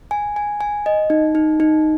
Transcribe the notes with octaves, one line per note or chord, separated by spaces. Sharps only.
G#5
G#5
G#5
D#5
D#4
D#4
D#4